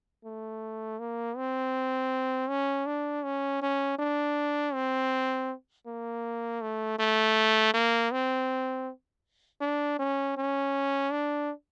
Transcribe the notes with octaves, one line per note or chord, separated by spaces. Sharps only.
A3
A#3
C4
C#4
D4
C#4
C#4
D4
C4
A#3
A3
A3
A#3
C4
D4
C#4
C#4
D4